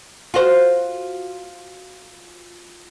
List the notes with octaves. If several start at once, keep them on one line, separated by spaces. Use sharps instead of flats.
F4 F#4 C5